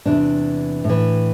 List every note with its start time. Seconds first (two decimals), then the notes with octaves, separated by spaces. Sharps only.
0.06 E2 C3 E3 D4
0.84 A2
0.89 E3